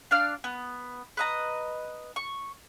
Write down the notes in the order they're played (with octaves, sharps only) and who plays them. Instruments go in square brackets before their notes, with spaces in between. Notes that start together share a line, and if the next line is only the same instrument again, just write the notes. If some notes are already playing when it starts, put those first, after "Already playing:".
[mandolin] D4 D5 F5 F6
B3
B4 D#5 A#5
C#6